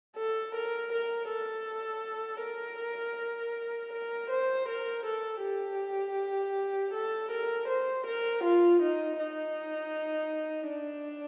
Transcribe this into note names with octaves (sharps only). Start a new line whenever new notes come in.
A4
A#4
A#4
A4
A#4
A#4
C5
A#4
A4
G4
A4
A#4
C5
A#4
F4
D#4
D#4
D4